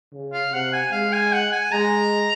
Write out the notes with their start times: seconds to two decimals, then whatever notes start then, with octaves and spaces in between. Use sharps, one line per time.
0.13 C#3
0.33 F5
0.53 C3 F#5
0.73 G#5
0.92 G#3 F5
1.12 G#5
1.33 F#5
1.52 G#5
1.72 G#3 A#5